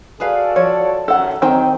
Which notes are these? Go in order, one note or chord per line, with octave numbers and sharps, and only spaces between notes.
F#4 G#4 A4 B4 D5 F5
F3 C#5
F#2 D#3 A4 F#5
D#3 F#3 C4 C5 D#5 G5